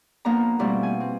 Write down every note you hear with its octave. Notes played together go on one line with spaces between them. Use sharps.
F3 A#3 B3 D4 A#5
B2 F3 G3 A3 C4 E4
G#5
C4